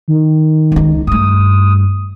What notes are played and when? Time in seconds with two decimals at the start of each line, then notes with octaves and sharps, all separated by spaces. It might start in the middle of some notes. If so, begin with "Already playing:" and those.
0.08 D#3
0.72 C#2 D#4
1.07 G2 A3 D#6